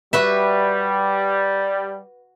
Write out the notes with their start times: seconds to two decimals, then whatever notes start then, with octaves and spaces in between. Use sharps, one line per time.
0.13 G3 F#4 B4 E5